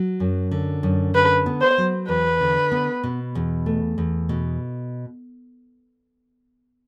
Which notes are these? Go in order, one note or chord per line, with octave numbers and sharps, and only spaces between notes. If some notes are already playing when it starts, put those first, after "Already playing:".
Already playing: F#3
F#2
D3
F#2
D3 B4
B3
C5
F#3
E2 B4
D3
B3
B2
E2
A3
E2
B2